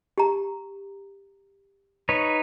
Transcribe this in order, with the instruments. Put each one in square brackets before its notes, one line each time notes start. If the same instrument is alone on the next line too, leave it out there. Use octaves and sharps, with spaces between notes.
[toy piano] G4 A#5
[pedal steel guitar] D#4 B4 C#5